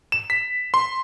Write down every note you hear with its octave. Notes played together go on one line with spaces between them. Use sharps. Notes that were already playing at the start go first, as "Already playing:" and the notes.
E7
B6
C6